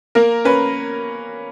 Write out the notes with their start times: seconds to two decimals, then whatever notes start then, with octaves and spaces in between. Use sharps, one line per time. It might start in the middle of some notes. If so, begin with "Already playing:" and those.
0.15 A#3 A#4
0.45 C#4 B4